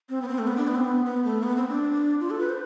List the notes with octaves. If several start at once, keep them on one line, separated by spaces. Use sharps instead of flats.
C4
B3
C4
A3
B3
D4
B3
C4
B3
B3
A3
B3
C4
D4
F4
A4
B4
C5